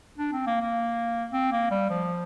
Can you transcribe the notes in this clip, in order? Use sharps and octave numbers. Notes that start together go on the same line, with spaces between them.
D4
C4
A#3
A#3
C4
A#3
G3
F3